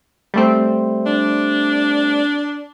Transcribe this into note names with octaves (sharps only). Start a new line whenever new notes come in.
G3 A3 C4
D4